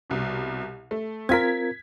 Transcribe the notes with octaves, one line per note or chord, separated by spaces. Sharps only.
C2 B2
A3
C4 F4 A#4 G#6 B6